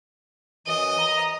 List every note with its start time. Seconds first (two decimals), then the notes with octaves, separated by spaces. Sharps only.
0.67 F#2 E3 D#5 D#6
0.98 A#5